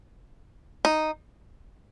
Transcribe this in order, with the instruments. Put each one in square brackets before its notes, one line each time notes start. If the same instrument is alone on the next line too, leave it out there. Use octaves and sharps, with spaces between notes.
[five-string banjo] D#4